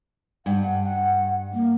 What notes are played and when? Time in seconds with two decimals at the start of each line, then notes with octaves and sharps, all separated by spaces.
0.46 G2 F#5
0.82 F#5
1.54 A#3